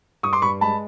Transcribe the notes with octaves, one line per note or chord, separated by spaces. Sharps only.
G2 C#6 D#6
C6 D6
G2 B5 C#6
G#3 A5 B5